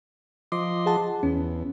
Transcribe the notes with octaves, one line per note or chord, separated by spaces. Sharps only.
F3 D#5 C6 D6
G#4 F#5 A5
E2 C#4